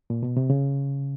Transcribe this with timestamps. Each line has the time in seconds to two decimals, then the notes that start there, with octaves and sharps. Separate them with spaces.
0.10 A#2
0.23 B2
0.37 C3
0.50 C#3